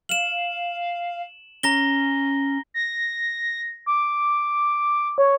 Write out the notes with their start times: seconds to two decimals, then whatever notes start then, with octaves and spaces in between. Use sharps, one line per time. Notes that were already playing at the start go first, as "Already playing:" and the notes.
0.09 F5 E7 F#7
1.63 C#4 A#5 A#6 G7
2.74 A#6
3.86 D6
5.18 C#5